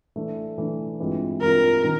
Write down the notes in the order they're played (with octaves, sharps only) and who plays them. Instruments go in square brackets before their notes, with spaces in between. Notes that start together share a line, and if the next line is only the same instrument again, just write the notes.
[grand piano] E3 A3 D4
E3 A3 D4
G2 E3 G#3 C4 F4
[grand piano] G2 E3 G#3 C4 F4 [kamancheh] A#4
[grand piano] D#3